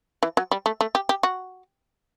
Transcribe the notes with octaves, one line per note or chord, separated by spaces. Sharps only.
E3
F#3
G3
A3
A3
G4
G4
F#4